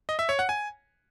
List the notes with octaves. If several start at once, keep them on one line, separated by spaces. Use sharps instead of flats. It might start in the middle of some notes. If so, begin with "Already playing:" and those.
D#5
E5
C#5
F#5
G#5